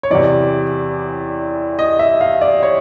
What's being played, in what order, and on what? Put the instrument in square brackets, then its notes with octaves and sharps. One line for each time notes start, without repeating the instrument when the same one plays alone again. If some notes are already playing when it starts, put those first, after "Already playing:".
[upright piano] C#5
E2 C3 E3 D5
D#5
E5
F5
D5
C#5